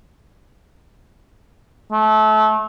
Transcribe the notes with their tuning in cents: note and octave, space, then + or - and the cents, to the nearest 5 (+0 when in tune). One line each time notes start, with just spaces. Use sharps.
A3 -30